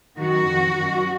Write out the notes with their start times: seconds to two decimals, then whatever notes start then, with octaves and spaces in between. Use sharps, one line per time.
0.17 F#2 D#3 F#4
0.46 F2 D#3
0.74 F#2 D#3